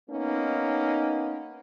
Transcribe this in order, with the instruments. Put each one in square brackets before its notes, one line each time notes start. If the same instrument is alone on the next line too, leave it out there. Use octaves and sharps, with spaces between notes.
[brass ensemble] A#3 B3 C#4 D#4